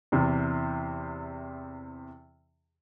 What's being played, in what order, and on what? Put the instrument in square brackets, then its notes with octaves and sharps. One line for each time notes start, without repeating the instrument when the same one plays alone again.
[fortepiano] E2 C3